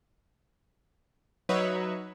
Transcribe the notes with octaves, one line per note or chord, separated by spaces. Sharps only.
F#3 D#4 B4 C#5 E5